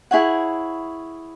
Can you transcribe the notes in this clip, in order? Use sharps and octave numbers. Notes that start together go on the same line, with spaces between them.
E4 G#4 C#5 F#5